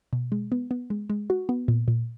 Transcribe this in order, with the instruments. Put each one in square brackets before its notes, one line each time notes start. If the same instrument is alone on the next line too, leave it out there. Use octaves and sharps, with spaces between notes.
[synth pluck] B2
G#3
B3
B3
G#3
G#3
F#4
B3
A#2
A#2